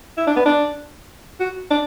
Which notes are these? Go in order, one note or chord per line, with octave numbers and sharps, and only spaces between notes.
E4
D4
B3
D4
F#4
D4